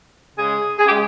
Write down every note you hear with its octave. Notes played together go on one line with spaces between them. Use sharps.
C#3 G#3 G#4
G#4
C#3 G#3 G4